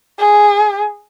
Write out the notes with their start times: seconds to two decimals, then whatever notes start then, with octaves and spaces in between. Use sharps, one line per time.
0.18 G#4